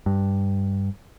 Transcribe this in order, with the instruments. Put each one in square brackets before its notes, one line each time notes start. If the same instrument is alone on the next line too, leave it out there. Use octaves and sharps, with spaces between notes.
[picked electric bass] G2